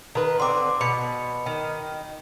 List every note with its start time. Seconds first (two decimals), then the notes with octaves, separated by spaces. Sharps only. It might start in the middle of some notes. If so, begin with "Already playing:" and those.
0.15 D#3 B4
0.40 D3 C4 C6 D6
0.81 B2 B5 C#7
1.46 D#3